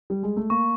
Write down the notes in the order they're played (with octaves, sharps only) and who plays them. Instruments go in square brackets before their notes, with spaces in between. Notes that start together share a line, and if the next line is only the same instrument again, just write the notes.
[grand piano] G3
G#3
A3
[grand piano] A#3 [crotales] C#6